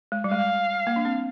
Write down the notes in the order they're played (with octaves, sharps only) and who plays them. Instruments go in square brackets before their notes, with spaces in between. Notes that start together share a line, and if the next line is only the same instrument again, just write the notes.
[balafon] G#3
G3
[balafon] G#3 [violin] F5
[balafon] A#3
D4
C4